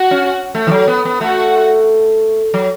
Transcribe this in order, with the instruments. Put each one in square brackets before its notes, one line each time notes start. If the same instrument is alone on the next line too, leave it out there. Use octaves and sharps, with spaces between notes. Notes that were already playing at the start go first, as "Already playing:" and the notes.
Already playing: [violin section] F#4 F#5
[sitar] C#4
A3
E3
F#3
B3
B3
[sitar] A3 [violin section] F#4 F#5
[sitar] F#3